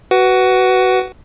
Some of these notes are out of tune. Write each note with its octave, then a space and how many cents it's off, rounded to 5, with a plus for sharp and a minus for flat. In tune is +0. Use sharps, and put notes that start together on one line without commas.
F#4 +15 B4 +0 F#5 +15